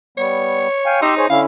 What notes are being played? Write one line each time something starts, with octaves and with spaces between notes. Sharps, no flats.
G3 B3 C#5
F5 G5 G#5
D#4 G4 C6 E6
G#4 C5 C#5
D3 C#4 E4 F5